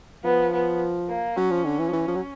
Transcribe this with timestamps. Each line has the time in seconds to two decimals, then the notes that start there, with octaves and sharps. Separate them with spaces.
0.24 F3 B3
0.53 B3
1.08 A#3
1.37 F#3 C#4
1.50 F3
1.65 D3
1.79 E3
1.89 F3
1.93 E3
2.07 F3
2.15 F#3